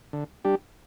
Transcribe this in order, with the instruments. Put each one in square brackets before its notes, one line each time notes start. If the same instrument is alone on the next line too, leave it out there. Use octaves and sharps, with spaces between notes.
[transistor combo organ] D3
G3 D4 G4